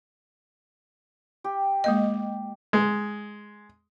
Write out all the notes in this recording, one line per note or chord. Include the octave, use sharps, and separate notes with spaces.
G4
G#3 A#3 D#5
G#3